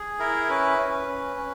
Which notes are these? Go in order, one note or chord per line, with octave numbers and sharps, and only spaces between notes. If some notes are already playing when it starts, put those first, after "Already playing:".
Already playing: G#4
E4 A#4
C#4 B4
C#4
C#4
C#4